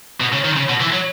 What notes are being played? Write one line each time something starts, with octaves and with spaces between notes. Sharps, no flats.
B2
C#3
D#3
C#3
B2
E3
F#3